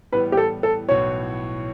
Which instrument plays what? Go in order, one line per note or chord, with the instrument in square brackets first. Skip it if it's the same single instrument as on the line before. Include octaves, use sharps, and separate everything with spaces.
[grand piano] A2 E3 G3 B3 [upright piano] B4
[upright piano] G4
A4
A4
[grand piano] B1 A2 E3 B3 F#4 [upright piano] C#5